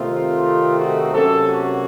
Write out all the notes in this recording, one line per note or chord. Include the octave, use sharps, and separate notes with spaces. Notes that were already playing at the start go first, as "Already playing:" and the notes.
Already playing: C3 D#3 A3 C4 D#4 F4
F#4
C3 F#3 A#3 C#4 A4
F#4